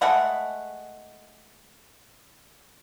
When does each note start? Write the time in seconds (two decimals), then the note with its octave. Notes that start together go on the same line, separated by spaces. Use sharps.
0.01 G#3 A3 F#5 B5